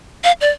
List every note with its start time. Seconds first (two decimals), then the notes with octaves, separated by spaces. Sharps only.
0.24 F5
0.41 D5